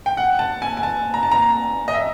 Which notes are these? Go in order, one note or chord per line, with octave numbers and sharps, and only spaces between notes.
G5
F#5
A5
G#5
G#5
A5
A#5
A5
A#5
D#5
E5